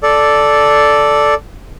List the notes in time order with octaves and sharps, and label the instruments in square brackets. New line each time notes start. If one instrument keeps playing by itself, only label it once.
[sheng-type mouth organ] A4 D5